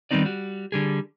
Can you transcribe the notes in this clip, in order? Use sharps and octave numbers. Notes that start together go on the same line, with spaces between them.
D#3 G3 B3 C4 D#4 D5
G3 F#4
D3 G3 G#4